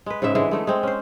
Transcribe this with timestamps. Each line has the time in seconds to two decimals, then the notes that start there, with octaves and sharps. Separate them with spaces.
0.06 G#3 B4
0.22 G#2 C#3 G#3 E5
0.35 D3 E3 G#3 E4
0.51 G#3 A3 D#4
0.67 G#3 C4
0.83 C#4 C5